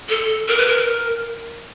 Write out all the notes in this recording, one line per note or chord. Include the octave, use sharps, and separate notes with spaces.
A4
A#4
B4
A#4